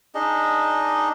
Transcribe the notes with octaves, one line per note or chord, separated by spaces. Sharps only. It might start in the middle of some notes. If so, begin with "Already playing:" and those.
D4 D#4 G#4 D#5